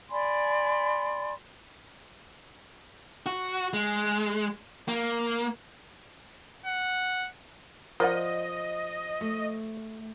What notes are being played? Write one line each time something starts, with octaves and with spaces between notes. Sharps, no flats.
D5 G#5 B5 C6
F#4
G#3
A#3
F#5
F3 A#4 D5 D#5 F#5
A3